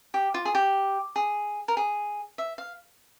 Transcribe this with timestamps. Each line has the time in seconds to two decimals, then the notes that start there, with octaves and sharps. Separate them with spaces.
0.14 G4
0.34 F4
0.45 G#4
0.55 G4
1.16 G#4
1.68 A#4
1.77 G#4
2.38 E5
2.58 F5